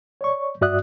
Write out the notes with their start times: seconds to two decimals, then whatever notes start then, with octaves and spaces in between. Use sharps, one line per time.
0.21 C#5 D5 C#6
0.61 G2 F#4 D5 E5 D#6 F#6